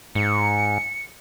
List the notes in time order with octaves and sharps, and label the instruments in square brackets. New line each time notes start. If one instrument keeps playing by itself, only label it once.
[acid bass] G#2 [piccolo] C#7